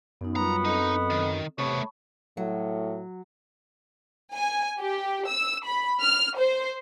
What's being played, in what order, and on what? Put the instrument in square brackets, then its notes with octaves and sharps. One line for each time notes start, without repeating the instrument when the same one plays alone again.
[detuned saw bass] F#2 [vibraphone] B3 D#4
[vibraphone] G3 F4 [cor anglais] B3 [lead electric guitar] A#5
[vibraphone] C4 A4 D#5 [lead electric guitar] D#4
[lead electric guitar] D#3
[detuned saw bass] C3 [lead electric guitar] A3 B3 [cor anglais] C#5 [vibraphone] A5 B5 C#6
[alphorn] A2 [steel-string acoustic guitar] F#3
[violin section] G#5
G4
E6
B5
F6
C5